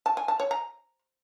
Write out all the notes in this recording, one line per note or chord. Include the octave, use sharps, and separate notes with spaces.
A5
G#5
A5
C#5
A#5